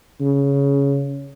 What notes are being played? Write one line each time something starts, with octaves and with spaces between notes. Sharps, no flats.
C#3